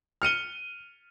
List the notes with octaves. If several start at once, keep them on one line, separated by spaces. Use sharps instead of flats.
F6 C#7 D#7 G7